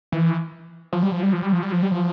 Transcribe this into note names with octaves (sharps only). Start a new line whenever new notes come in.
E3
F3
G3
F3
G3
F3
G3
F3
G3
F3
G3
F3